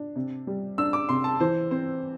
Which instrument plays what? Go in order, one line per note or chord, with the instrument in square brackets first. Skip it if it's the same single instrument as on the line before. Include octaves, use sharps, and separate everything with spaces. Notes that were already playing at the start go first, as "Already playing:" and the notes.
Already playing: [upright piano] D4
C3
G3
[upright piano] D4 [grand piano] E6
[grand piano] D6
[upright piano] C3 [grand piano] C6
[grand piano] A5
[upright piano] E3 [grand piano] C5
[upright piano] C4 [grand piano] C5